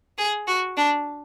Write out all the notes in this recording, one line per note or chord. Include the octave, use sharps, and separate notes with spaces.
G#4
F#4
D4